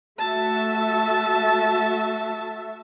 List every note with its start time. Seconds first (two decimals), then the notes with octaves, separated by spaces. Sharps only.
0.19 A3 F#4 E5 A5